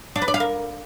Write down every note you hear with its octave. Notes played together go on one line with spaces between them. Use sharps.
D4
B4
D5
F5
A#4